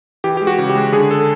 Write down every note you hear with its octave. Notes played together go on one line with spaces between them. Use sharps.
E3 G4
G4
G#3
F#4
C#3
G4
G#3
D3 G#4
A4